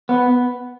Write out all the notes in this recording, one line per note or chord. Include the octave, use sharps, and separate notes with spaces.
B3